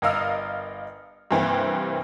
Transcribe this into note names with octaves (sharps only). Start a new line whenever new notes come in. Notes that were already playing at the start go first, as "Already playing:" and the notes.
G1 A#4 D#5 F5 E6 F6
G2 C3 E3 A#3 C4